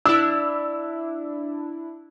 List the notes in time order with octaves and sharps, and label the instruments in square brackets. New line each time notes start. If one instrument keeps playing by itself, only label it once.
[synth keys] D4 E4 [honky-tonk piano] E6